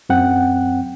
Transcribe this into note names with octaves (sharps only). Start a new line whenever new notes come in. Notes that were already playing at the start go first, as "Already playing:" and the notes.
F#2 C4 F#5 G5